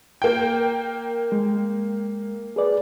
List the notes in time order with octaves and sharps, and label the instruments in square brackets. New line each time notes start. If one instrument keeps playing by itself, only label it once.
[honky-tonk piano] A#3 G5
[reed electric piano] G#3
G#4 B4 D5